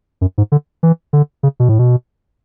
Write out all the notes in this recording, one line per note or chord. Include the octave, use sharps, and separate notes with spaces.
F#2
G#2
D3
E3
D3
C#3
B2
A2
B2